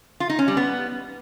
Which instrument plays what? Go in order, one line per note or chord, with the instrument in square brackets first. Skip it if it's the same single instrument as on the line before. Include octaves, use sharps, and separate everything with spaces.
[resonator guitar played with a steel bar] F4
D#4
C#4
G3
B3